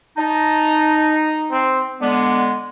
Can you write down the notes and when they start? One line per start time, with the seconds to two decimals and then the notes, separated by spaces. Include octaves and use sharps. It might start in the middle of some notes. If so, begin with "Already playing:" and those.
0.17 D#4 A5
1.51 C4
2.01 D3 G#3 B3 D4